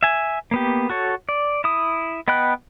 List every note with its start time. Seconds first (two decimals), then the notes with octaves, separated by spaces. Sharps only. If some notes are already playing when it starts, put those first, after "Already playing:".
0.03 E5 G#5
0.51 A#3 B3 G4
0.90 F#4 A4 C#5
1.29 D5
1.64 E4 D#6
2.28 B3 D#5 G5 B5 F#6